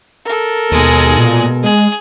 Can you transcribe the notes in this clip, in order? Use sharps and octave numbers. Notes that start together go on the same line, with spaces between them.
A4 A#4
D#2 B2 G#3 G#4
A#2
G#3 G#4